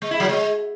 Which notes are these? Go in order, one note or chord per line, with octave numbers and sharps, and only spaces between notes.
G#3
E4
F#3
G#3